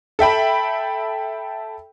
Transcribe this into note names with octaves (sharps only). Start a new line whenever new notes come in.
A4 E5 G5 B5